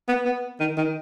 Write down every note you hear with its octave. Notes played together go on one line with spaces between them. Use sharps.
B3
B3
D#3
D#3